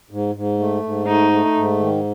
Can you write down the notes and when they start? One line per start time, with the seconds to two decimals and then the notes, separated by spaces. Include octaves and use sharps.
0.11 G#2
0.35 G#2
0.59 A3
0.83 G#2
1.07 A3 D#4
1.32 A3
1.56 G#2
1.79 D#3